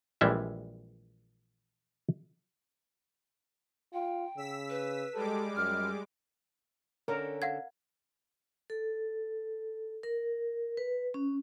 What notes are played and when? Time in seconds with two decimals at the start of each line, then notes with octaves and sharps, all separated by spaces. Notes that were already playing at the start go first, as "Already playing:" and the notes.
0.21 A#1 E3 G3 G#3 E5
3.93 F4 G5
4.37 C#3 E6 B6
4.70 B4
5.14 G3 G#3 A4 D6
5.57 F#2 F6
7.08 D3 C#4 A4 A#4
7.42 F5 F#5 G#6
8.70 A4
10.03 A#4
10.77 B4
11.14 C#4